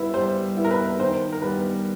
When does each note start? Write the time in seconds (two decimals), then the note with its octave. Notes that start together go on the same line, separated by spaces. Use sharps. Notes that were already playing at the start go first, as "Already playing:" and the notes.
Already playing: G3 B3 E4 B4
0.14 G3 C5
0.56 B3 E4
0.64 A#4
0.71 B4
0.99 D#3 C5
1.32 A#4
1.42 G3 B3 B4